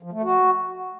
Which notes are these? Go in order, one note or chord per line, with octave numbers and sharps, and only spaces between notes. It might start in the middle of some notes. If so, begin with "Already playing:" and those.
F3
A3
F#4